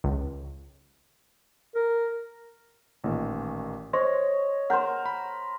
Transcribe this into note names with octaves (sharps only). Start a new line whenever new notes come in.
C#2
A#4
A1 A#2 D#3
C5 C#5 D#5 C6 A#6
A#4 C5 F#5 G6
B5